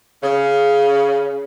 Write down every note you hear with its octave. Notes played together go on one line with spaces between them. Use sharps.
C#3